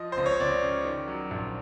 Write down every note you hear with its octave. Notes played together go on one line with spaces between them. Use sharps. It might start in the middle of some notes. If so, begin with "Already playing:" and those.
Already playing: F3 D#5
C#2 C5
C#5
C#2 D5
C#3
D#3
F#3
A#1